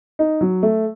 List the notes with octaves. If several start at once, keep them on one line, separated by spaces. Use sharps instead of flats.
D#4
F#3
A3